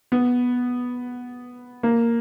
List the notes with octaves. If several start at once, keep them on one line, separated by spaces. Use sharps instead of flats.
B3
A#3